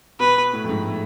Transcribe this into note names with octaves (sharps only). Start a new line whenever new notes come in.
B2 B4
A2
F2
G#2
A2